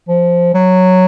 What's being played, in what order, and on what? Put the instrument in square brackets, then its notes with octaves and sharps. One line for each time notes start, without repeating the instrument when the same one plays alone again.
[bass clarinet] F3
F#3